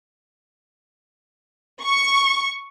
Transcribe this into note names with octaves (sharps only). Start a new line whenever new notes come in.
C#6